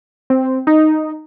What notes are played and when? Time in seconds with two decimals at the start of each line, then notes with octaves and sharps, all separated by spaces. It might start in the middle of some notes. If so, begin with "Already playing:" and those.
0.30 C4
0.67 D#4